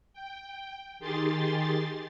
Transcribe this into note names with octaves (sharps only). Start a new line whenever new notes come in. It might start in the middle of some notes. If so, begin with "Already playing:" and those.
G5
D#3 G4 G#4 C6 A6